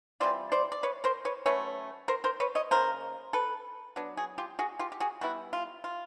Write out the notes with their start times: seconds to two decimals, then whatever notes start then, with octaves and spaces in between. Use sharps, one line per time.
0.20 E3 G3 C4 F4 C5 D5
0.52 C5 D5
0.72 D5
0.83 B4 C#5
1.04 A#4 C5
1.25 B4 C#5
1.46 F#3 A3 C#4 B4 C#5
2.08 A#4 C5
2.24 A#4 C5
2.40 B4 C#5
2.55 C#5 D#5
2.71 C#3 F#3 A#3 A#4 C5
3.33 A4 B4
3.96 F#3 B3 D4
4.17 F#4 G#4
4.38 F4 G4
4.59 F#4 G#4
4.79 F4 G4
4.92 G4
5.00 F#4 G#4
5.21 G3 B3 E4 F#4
5.53 F4
5.84 F4